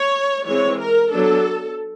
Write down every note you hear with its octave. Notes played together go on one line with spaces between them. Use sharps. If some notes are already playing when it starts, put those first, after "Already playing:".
Already playing: C#5
E3 G#3 C4 C#5
A#4
F#3 B3 D4 A4